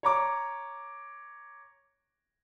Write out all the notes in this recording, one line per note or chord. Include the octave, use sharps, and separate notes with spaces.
C#5 A#5 D6